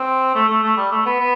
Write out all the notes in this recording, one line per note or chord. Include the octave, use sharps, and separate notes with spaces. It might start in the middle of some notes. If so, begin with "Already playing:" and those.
Already playing: C4
A3
A3
A3
G3
A3
B3
B3